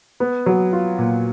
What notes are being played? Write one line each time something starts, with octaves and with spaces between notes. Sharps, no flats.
B3
F#3
F4
A#2